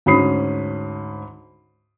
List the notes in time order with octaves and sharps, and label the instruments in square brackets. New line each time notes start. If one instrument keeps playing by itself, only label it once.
[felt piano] D2 G#2 C#4 B5 D#6 C7